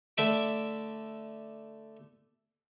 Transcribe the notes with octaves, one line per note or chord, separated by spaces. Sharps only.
D3 A3 D5 E5 D6